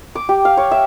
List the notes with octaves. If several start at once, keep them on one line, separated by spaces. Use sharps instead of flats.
D6
G4
F5
C#5
E5